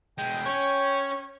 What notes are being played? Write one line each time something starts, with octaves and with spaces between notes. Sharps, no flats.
B2 G#3 G5
C#4 C#5